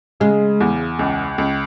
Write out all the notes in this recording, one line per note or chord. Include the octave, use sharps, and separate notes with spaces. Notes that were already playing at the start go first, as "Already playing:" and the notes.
C#3 G#3
E2
C#2
C#2